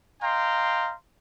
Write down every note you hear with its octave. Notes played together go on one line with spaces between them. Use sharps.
D#5 F5 G5 A#5 C6